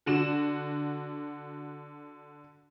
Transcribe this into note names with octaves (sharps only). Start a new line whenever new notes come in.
D3 F#4 E7